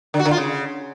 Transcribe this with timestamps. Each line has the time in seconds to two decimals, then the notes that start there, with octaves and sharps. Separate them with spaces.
0.14 D3
0.20 F#4
0.25 D3
0.31 F4
0.37 C#3